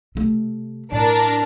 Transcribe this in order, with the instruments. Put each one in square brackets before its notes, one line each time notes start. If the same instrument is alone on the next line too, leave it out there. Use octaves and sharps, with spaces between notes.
[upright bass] C3 A3
[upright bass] A2 [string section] D4 A#4